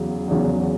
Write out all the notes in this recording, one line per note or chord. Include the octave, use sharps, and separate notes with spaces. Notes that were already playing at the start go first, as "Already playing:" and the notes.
Already playing: E2 C#3 F#3
E2 C#3 F#3